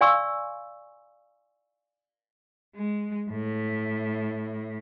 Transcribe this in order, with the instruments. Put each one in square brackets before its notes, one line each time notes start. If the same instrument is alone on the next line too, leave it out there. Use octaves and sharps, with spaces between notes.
[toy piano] D5 F5 G#5 C6 C#6 E6
[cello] G#3
A2